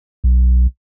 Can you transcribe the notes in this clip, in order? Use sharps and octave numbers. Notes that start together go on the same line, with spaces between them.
B1